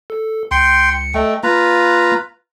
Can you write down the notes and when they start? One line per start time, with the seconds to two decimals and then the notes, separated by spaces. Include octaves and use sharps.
0.10 A4
0.51 C#2 G5 C6 C#7
1.14 A3 D#5 G5
1.43 A#3 F4 B4 A#5